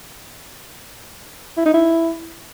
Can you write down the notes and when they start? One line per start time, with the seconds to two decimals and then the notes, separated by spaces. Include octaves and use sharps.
1.57 E4
1.65 D#4
1.74 E4